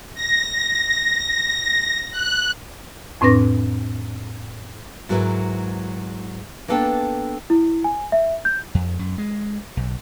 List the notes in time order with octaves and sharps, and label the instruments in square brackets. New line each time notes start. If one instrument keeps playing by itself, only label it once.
[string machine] A#6
F#6
[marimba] F2 A2 C4 D4 B4 A#6
[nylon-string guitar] G#2 F#3 E4 A#4 B4
A#3 B3 D4 A4 B4 G5
[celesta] E4
G#5
E5
G6
[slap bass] F2
F#2
G#3
B1